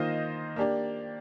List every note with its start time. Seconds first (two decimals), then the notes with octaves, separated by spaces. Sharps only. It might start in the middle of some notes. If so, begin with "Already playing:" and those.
Already playing: D#3 A#3 F4 C5 D#5
0.56 A#3 D4 G4 D5